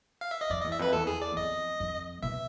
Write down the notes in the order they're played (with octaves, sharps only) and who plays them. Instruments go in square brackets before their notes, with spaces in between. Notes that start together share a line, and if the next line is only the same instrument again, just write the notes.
[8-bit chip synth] F5
E5
D#5
[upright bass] F2 [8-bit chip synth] D5
[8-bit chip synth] D#5
[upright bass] E2
[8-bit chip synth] E5
[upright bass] F2 [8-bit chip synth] B4
[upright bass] E2 [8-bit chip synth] A4
[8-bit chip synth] G#4
D5
[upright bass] F2 [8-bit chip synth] D#5
[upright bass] F2
[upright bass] B2 [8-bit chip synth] E5